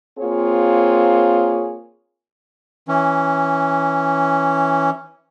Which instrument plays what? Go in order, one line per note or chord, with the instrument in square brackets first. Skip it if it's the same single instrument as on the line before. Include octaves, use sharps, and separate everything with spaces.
[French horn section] A#3 C4 F4 G#4 C#5
[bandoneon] E3 C#4